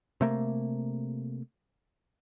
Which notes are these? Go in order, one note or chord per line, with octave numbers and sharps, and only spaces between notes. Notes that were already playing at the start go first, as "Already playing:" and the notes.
C3 A3 A#3